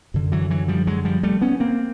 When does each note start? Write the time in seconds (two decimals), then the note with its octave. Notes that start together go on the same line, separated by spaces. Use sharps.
0.14 F#2 D3
0.32 E3 F#3
0.50 E3 F#3
0.68 F3 G3
0.87 F#3 G#3
1.05 F3 G3
1.23 G3 A3
1.41 B3 C#4
1.60 A#3 C4